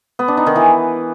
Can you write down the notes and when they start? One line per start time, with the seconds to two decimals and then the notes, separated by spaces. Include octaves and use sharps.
0.19 B3
0.28 D4
0.37 D#4
0.46 D#3
0.56 E3